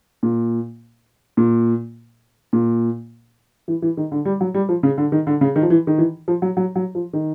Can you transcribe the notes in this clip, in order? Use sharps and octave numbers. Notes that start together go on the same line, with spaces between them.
A#2
A#2
A#2
E3
E3
D#3
D3
G3
F#3
G3
F3
C#3
D3
D#3
D3
C#3
D#3
F3
E3
D#3
E3
F3
F#3
F#3
F#3
F3
D#3